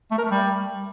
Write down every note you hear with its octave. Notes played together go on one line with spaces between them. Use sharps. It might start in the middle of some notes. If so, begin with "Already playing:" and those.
A3
A#4
A3
G3